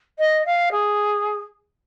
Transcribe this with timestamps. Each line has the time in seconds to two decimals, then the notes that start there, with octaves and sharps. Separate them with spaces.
0.18 D#5
0.45 F5
0.71 G#4